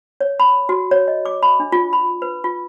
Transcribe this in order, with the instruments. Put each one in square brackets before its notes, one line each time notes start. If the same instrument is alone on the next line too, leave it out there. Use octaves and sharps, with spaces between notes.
[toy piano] C#5
B5
F#4
C#5
D#5
D6
B5
D4
F4
B5
B4
F4